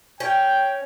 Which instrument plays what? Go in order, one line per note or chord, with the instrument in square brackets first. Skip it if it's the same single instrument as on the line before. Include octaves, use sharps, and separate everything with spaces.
[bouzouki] C#4 [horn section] G5